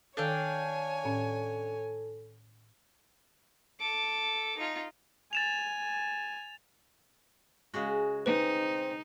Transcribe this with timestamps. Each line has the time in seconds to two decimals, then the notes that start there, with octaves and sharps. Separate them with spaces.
0.17 D#3 D4 A4 C#5 F5 G5 G#5
1.05 A2 C#4 A4
3.79 A4 D6
4.58 D#4 F4
5.33 G#5 A6 E7 F7
7.74 C#3 G#3 F#4
8.26 C4 D#4 B4